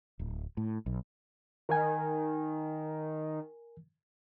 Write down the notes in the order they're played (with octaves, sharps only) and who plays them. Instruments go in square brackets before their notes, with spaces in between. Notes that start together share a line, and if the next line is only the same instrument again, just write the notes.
[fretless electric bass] D1
A2
B1
[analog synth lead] D#3 [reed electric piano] A#4 G#5